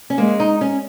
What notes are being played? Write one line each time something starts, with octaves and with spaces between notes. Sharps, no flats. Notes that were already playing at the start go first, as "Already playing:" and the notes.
C#4
G#3 A#3
D#4
C#4